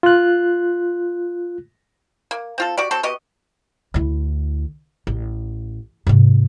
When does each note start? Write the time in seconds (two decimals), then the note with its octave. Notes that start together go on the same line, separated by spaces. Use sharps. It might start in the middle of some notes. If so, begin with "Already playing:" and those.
0.03 F4 F#6
2.31 A#3
2.58 C4 F4 A4
2.78 F#4 G4 D5
2.91 F#3 C4 A4
3.03 B3 F#4 G4 D#5
3.94 D2 E4
5.07 A1
6.07 G#2 C3